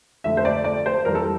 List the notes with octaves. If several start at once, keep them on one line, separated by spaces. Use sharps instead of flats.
F2 D3 A3 E5
C5
D5
D5
C5
F2 E3 G3 A#4
A4